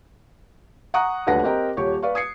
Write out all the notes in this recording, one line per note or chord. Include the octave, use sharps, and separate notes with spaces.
F#5 A#5 C#6 D#6 F#6
D#1 D2 D4 B4 F#5 A#6
C4 G4 A#4 D#5 G5 A#5
D#1 G4 C#5 C#6
B4 D5 F5 C#6
D#6 G#6 C7 C#7